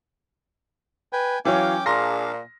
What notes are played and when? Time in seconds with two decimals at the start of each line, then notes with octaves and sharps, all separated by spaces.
1.13 B4 G5 G#5
1.45 E3 F#3 C#4 C#5 F5 G5 D6
1.86 A#2 D4 G#4 F5 A#5 C6 A#6